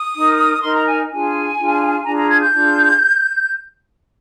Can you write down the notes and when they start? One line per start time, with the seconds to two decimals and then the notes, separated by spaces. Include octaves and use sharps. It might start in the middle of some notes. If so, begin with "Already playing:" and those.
Already playing: D#6
0.15 D#4 A#4
0.62 D#4 A#4 C6
0.74 A#5
0.86 G#5
1.10 D4 F4 G#4 G#5
1.58 D4 F4 G#4
2.05 D4 F4 G#4 A#5
2.17 A#5
2.29 G#6
2.40 G6
2.52 D4 F4 G#4